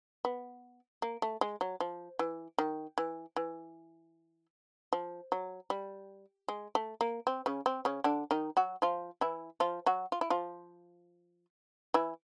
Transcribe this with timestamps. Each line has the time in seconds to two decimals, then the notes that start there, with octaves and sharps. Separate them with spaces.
0.25 B3
1.02 A#3
1.22 A3
1.41 G#3
1.61 F#3
1.80 F3
2.19 E3
2.58 D#3
2.98 E3
3.36 E3
4.93 F3
5.32 F#3
5.70 G3
6.48 G#3
6.75 A3
7.01 A#3
7.27 C4
7.46 C#3 C#4
7.66 C4
7.85 C#3 C#4
8.04 D3 D4
8.31 D#3 D#4
8.57 F#3 F#4
8.82 F3 F4
9.21 E3 E4
9.60 F3 F4
9.86 F#3 F#4
10.12 F4
10.21 E4
10.30 F3 F4
11.94 E3 E4